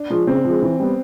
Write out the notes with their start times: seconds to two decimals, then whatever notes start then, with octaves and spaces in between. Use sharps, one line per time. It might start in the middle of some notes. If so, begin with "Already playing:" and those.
Already playing: D4
0.10 F3 G#3
0.27 C#3 C4
0.45 F3 G#3
0.62 E3
0.80 G3 B3